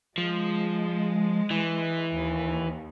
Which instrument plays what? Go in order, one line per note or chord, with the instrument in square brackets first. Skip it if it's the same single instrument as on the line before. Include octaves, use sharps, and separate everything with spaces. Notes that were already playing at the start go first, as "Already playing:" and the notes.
[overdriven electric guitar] F3 [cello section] G#3
[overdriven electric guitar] E3
[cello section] D#2